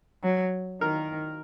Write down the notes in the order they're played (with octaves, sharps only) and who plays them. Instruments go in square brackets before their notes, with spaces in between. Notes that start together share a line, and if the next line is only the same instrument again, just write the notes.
[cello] F#3
[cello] D#3 [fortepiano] A#4